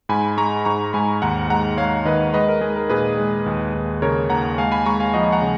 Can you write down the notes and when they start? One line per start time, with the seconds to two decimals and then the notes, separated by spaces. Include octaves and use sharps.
0.09 G#2 G#5 B5
0.38 G#3 A#5 C#6
0.65 G#2 A#5 C#6
0.93 G#2 G#5 B5
1.22 D#2 F#5 A#5
1.50 G#3 F#5 A#5
1.78 G#3 C#5 F5
2.05 D#3 B4 D#5
2.33 G#3 B4 D#5
2.48 A#4
2.61 G#3 G#4
2.76 A#4
2.90 A#2 G#4 B4
3.18 G#3
3.46 D#2
3.75 D#2
4.02 C#3 A#4 C#5
4.30 D#2 F#5 A#5
4.58 G#3 F5 G#5
4.72 G#5 B5
4.86 G#3 A#5 C#6
5.00 F5 G#5
5.14 F3 D#5 F#5
5.33 F#5 A#5
5.42 C#3